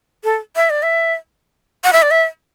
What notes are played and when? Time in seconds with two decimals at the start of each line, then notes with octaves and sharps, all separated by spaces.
0.24 A4
0.56 E5
0.70 D5
0.83 E5
1.84 F#5
1.93 E5
2.02 D5
2.11 E5